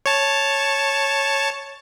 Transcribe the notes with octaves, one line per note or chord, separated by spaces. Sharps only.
C#5 A5